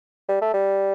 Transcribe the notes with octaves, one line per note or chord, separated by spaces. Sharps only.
G3
A3
G3